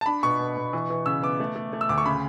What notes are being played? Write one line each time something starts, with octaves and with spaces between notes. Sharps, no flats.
A5
D4 B5
B2 C#6
B2
B2
E3
E3
C#3 E6
B3 D6
A3
A3
A3
E6
D2 D6
C#6
C#3 B5